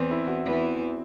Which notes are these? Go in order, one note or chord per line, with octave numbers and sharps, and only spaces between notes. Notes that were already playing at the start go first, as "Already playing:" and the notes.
Already playing: E2 E3 C4
E4
F#4
E2 E3